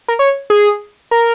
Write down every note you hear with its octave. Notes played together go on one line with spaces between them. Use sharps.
A#4
C#5
G#4
A#4